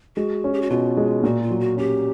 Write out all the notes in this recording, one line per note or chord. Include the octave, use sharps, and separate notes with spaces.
G#3 F#4
C#4
G4
F#4
B2 F4
G#3
A#2 F#4
F4
F#3
F#4
C#4 G4